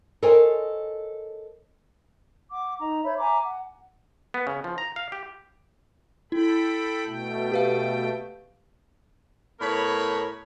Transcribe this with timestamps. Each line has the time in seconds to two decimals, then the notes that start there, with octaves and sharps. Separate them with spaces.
0.22 A4 A#4 C5 C#5 D#5 G#5
2.52 F#5 D6
2.79 D#4 D#5 A#5
3.04 C5 C#5 E5 B5
3.18 E5 G#5 A#5 D6
3.43 F#5
4.34 B3
4.47 C#3
4.64 F3
4.78 A#5
4.96 F5
5.12 G4
6.32 E4 A4 G5 B5
7.06 B2 A3 G5
7.52 G4 B4 F5
9.60 A2 B3 A#4 C#5 B5